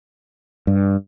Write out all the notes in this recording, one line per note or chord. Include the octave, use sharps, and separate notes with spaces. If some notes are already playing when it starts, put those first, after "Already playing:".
G2